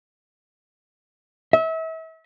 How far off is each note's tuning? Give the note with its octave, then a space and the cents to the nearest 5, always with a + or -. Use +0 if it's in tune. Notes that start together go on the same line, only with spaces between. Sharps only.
E5 -35